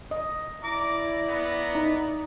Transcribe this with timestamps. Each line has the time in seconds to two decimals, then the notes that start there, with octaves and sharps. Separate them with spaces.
0.11 D#5
0.64 E4 D5 A#5 D6
1.28 B3
1.75 D#4